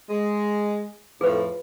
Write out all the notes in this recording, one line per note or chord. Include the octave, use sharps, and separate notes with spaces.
G#3
F2 A2 F3 G#4 B4